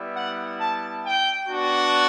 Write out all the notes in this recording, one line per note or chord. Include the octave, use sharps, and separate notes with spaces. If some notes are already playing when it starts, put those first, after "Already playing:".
Already playing: G3 B3 E4
F#5
A5
G5
B3 D4 F#4